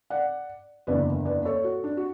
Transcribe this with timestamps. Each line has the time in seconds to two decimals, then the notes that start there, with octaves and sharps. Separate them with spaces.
0.10 D5 F#5
0.87 F#1 E2 D3 B4 D5
1.25 B4 D5
1.45 A4 C#5
1.64 F#4 A4
1.84 D4
1.97 F#4